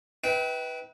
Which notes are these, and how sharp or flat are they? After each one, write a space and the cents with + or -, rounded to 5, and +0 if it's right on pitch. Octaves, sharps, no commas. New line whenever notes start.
E4 -45 B4 +0 G5 -15